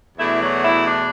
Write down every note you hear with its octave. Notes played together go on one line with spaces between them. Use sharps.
E2 B2 A3 D4 E4
F#3 F#4
E4
D4